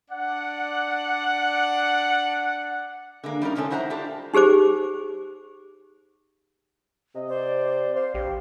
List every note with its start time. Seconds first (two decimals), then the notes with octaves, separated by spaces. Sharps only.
0.11 D4 D5 F#5
3.24 D3 G#3 A#3
3.42 G3 C#4 D#4 A#4
3.55 C3 F3 G#3 C#4 A4
3.70 D#4 E4 C5 F#5 A5 A#5
3.90 D4 F4 G4 A4
4.34 D#4 G4 G#4 C5 D6
7.15 C3 D#5
7.29 C5 D5
7.95 C5 F5
8.14 A#1 G4